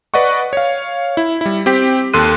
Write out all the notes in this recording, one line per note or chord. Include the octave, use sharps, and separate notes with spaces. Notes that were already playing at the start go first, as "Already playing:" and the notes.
B4 D5 D#5 F#5 C#6
C#5 F5
E4
G3 E4
C4 G4 G5 B6
D#2 A4 C6 F#6 D#7